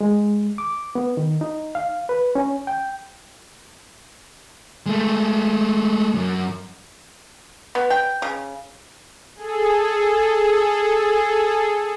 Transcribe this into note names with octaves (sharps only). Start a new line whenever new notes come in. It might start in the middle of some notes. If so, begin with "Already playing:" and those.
G#3
D6
B3
D#3
D#4
F5
B4
C#4
G5
G#3 A3
F#2
B3
G5
C#3
G#4 A4